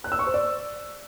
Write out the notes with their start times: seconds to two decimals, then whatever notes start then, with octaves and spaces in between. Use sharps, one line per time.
0.04 F#6
0.12 E6
0.19 C#6
0.27 C5
0.34 D5